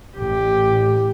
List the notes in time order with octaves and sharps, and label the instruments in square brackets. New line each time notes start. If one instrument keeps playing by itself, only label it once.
[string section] A1 [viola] G4